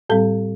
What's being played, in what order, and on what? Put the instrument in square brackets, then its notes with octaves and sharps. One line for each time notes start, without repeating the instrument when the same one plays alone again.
[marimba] A2 G3 C4 A4